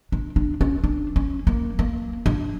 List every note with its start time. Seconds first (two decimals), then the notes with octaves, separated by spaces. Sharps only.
0.12 D4
0.36 D4
0.61 C#4
0.84 D4
1.16 C#4
1.47 A#3
1.79 A#3
2.26 D4